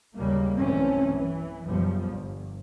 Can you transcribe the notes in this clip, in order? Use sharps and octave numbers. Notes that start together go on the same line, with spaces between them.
G#1 D#2 C#3 G3 A#3
B1 G2 E3 A3 C4 C#4
E3
F#1 B2 F3 G3
G1